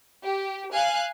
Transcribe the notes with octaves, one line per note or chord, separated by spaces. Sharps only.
G4
F5 G#5 F#6